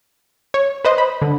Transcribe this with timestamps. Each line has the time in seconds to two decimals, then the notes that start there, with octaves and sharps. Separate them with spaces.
0.54 C#5
0.85 B4 C5 D#5
0.98 B5
1.22 D3